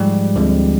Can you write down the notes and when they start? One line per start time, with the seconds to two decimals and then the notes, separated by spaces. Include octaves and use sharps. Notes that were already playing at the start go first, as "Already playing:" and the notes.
Already playing: G#2 F3 G3 G#3 G4
0.36 D2 D3 F3 G#3 C4